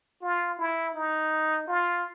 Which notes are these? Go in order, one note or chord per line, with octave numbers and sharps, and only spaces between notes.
F4
E4
D#4
F4